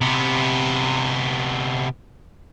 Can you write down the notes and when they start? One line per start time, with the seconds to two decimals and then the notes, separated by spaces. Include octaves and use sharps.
0.01 C3 B3